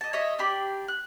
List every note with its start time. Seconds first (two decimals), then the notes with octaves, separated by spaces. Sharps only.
0.01 D#5 A5
0.13 C#5 D#5 E5
0.39 D4 G4 B5
0.88 F#6